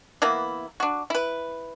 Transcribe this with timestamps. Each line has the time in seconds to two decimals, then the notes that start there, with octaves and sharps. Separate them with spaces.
0.22 E3 A#3 B3 E4
0.80 D4 F#4
1.10 E4 B4